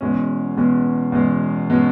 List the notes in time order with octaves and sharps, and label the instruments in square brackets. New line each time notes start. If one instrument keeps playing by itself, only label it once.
[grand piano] E2 B2 G#3 C#4
E2 B2 G#3 C#4
E2 B2 G#3 C#4
B2 G#3 C#4